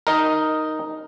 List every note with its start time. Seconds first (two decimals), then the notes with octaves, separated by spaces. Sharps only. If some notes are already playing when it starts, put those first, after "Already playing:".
0.07 D#4 A#4